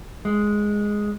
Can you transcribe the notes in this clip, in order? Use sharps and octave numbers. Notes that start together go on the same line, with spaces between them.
G#3